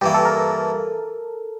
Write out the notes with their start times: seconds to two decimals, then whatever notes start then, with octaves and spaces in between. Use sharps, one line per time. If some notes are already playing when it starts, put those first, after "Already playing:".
0.01 G2 E3 A#3 G4
0.14 A4
0.25 A#4
0.38 A4